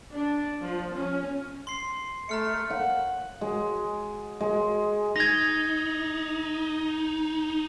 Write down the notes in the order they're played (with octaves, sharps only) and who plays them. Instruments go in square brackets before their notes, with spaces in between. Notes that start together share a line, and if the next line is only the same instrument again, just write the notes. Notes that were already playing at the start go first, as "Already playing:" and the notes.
[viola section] D4
F3
C#4
[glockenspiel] C6 C7
[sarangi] A3 [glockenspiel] A#5 F6 C#7
[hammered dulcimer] F#5
G#3
G#3
[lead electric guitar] D#4 [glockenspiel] G#6 A#6